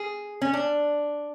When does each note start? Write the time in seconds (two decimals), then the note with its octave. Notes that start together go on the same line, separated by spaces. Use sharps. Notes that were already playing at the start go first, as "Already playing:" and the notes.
Already playing: G#4
0.42 C#4
0.53 D4